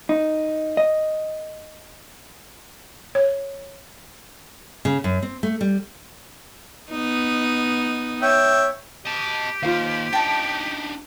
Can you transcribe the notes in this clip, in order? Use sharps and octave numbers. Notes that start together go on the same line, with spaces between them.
D#4
D#5
C#5
C#3
F#2
C4
A3
G3
B3 D#4
C#5 E5 G5
G4 D#5 A5
D#2 F4 C5 F5
D4 D#4 G5 A5